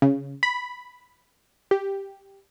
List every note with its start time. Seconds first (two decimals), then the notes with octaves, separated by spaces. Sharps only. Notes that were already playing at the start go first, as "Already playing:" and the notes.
0.02 C#3
0.43 B5
1.71 G4